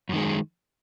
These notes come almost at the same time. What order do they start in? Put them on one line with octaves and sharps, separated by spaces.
F#2 D#3 G#3